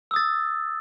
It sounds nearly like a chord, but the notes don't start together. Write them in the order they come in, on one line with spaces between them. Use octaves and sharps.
E6 D#6 A6